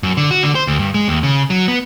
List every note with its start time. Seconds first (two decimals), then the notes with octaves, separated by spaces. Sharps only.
0.03 F#2
0.17 D3
0.31 F#4
0.43 D3
0.55 C5
0.67 D2
0.79 G2
0.94 G#3
1.08 D#2
1.23 C#3
1.50 F#3
1.68 B3